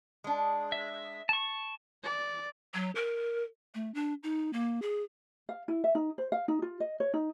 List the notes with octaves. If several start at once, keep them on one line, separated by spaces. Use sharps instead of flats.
G#3 D4
E5
A5 C#6
D5
F#3
A#4
A3
D4
D#4
A#3
G#4
F5
E4
E5
D#4
C5
F5
D#4
F4
D#5
C#5
D#4